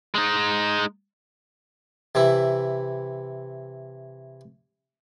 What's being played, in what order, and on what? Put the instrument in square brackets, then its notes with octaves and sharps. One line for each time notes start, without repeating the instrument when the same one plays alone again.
[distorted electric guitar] G#3 D#4
[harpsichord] C3 E3 E4